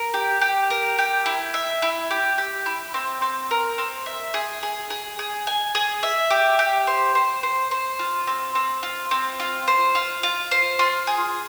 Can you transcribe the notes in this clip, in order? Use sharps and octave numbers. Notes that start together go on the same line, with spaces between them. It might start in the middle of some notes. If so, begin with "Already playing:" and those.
Already playing: A#4
G4
G4
A#4
G4
E4
E5
E4
G4
G4
E4
C4
C4
A#4
C4
E5
G#4
G#4
G#4
G#4
G#5
G#4
E5
G4
G4
C5
C5
C5
C5
F4
C4
C4
F4
C4
F4
C5
F4
F4
C5
F4
G#4